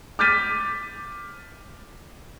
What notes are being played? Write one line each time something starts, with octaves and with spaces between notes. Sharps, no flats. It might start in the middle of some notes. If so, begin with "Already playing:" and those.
D6 F6 G6 A6 B6 D#7